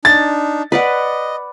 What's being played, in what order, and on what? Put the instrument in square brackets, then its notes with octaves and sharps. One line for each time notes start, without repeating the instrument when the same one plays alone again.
[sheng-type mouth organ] D4 D#4 [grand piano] A6
[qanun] B4 D5 F#5 [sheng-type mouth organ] D#5